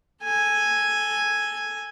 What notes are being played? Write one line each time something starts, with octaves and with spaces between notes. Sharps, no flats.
A4 G#5